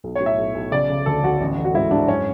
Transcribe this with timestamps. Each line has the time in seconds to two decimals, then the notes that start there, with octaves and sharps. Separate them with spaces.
0.04 B1
0.15 A2 C#5
0.26 E5
0.38 B1
0.55 B1
0.72 C#3 D5
0.90 C#3
1.06 D2 A4
1.23 D2 F#4
1.41 A1
1.57 A1
1.65 F#4
1.74 G#2 E4
1.91 G#2 D4
2.08 F#2 C#4